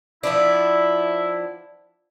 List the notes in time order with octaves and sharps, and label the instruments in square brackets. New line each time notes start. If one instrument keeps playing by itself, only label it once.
[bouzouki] F3 B3 D4 [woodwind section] E4